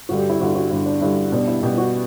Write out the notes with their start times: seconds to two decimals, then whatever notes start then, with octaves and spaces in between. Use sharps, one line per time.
0.09 G2 D3 G3 F#4
0.19 G4
0.30 E4
0.40 G2 D3 G3 F#4
0.55 F#4
0.71 G2 D3 G3 E4
0.86 D4
1.01 G2 D3 G3 E4
1.32 B2 G3 D4
1.48 E4
1.63 B2 G3 G4
1.78 F#4